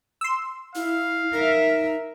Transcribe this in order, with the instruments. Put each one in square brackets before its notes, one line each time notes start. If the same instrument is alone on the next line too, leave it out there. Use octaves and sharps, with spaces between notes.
[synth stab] C6 E6
[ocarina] E4 [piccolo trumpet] F5
[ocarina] D#4 [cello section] A#4 E5